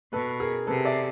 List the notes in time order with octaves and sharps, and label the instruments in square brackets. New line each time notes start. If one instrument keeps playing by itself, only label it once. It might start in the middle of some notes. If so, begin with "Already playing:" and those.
[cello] B2 [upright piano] A4 B4
[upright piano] G#4 A#4
[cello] C3 [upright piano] A4 B4
[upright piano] D5 E5